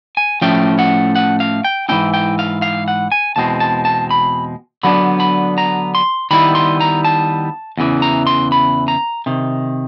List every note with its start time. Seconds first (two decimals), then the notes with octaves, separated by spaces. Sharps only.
0.17 G#5
0.41 A2 F3 A3 C#4 G5
0.79 F#5
1.16 F#5
1.40 F5
1.64 G5
1.89 G#2 E3 G#3 C#4 E4 G5
2.14 G5
2.39 F5
2.62 F5
2.88 F#5
3.12 G#5
3.36 E2 B2 G#3 C4 A5
3.60 A5
3.85 A5
4.11 B5
4.83 D3 F#3 B3 D4 B5
5.20 B5
5.58 A#5
5.95 C6
6.31 D#3 G3 B3 E4 B5
6.55 C6
6.81 A#5
7.05 A5
7.78 E2 C#3 E3
8.02 A#5
8.27 C6
8.52 B5
8.88 A#5
9.26 C3 D#3